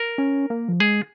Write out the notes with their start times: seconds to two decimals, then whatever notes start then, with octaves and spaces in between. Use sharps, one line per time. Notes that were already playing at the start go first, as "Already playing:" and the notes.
Already playing: A#4
0.18 C#4
0.50 A#3
0.68 F3
0.80 G#3 G#4